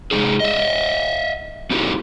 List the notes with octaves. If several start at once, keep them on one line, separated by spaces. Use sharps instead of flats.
C3 G#3 A#3 D#4 G#4
D#5 E5
B3 D#4 E4 F#4 G4 A4